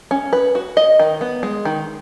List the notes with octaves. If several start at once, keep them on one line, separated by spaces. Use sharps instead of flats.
C#4
B4
F#4
D#5
D#3
B3
G#3
D#3